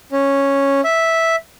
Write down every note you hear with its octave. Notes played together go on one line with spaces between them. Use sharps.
C#4
E5